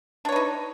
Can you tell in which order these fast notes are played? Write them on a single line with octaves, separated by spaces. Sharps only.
D4 C#5 B4 D#4